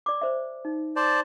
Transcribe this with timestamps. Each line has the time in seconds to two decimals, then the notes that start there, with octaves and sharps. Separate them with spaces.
0.06 D5 D6
0.22 C5 E5
0.65 D#4
0.96 C5 D5 A5